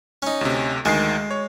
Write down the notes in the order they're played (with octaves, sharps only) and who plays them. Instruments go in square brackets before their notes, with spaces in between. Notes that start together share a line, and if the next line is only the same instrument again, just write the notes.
[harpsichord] C#4 D#4
[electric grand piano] D2 C3
[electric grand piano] D2 D#3 C7 [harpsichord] G#3
[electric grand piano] C#5